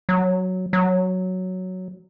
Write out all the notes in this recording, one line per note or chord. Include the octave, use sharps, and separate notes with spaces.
F#3
F#3